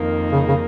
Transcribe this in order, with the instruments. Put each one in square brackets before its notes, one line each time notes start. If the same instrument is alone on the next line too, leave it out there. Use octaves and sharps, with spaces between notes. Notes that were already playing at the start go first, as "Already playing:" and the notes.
Already playing: [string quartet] F2 D#3 A#3 D#4
[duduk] C#3
C#3